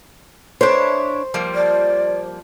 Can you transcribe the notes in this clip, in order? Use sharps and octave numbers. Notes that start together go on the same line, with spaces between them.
D4 E4 C5 C#5
F3 G3 A#3
D5